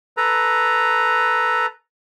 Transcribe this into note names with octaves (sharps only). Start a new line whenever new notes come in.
A4 B4 A#5